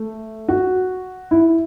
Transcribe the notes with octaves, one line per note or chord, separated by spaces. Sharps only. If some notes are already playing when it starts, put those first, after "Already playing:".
Already playing: A3
F#4
E4